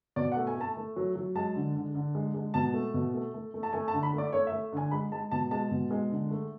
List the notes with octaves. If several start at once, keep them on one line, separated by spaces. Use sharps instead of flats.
B2 D5
F#5
A3
G#5
A3 A5
A3
F#3
F#3
G#3 A5
D3
D3
D3
G#3
G#3
B2 A5
A3
B2
A3
A3
A3
A5
A3 G#5
A5
D3
B5
A3 D5
A3 C#5
E5
A3
D3 G#5
G#3 B5
G#3 A5
B2 A5
G#3 A5
B2
G#3
D3
A3